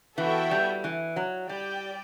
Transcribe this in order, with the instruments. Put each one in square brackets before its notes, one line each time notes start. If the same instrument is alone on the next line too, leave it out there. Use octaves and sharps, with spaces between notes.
[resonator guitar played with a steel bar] E3 [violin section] B3 F#4 A4 E5 G5
[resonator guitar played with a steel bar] G3
E3
F#3
[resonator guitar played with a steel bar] G3 [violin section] G4 D5 G5